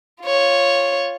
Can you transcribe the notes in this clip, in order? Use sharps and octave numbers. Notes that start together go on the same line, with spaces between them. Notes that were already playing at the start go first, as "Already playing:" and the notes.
F4 C#5